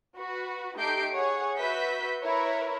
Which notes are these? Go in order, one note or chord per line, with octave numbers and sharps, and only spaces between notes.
F#4 B4
A3 D#4 G4 G6 C7 D7
G#4 C#5 F#5
F#4 B4 E5 G6 B6
E4 A#4 B4 C#5